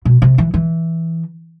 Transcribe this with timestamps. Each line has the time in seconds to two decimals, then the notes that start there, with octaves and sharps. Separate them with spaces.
0.05 B2
0.22 C3
0.38 E3
0.54 E3